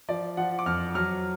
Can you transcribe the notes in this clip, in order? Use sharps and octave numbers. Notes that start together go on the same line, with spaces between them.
F3 D5
F3 F#5
D6
F2 F6
F#3 F6